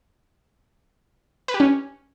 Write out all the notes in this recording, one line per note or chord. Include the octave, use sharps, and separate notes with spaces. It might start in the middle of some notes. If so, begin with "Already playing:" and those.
B4
G4
C#4